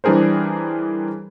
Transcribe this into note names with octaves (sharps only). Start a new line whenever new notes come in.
E3 G3 D4 G#4 A#4 C5